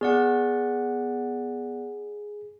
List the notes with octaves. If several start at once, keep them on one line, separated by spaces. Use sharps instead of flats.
B3 G#4 D5 F#5